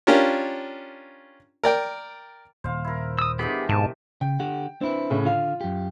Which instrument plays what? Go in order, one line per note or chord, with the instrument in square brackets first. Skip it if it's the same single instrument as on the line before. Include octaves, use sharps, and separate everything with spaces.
[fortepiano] C#4 D4 F4 G4 A#4 C#5
A#4 D5 G5
[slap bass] D#1 [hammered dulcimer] C5 F5
[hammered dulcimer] E4 A#4
[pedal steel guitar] D#6 E6
[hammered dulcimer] G2 D#3 E3 [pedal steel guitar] B3 G4 G#4
[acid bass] G#2 [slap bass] B2 [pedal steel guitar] A5
[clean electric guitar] C#3 [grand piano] G5
[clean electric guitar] D3 G4 F#5
[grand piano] C4 [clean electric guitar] D4 E4 B4
[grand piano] A2 C#3
[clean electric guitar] D3 F5 [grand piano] F4
[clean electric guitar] F#2 G4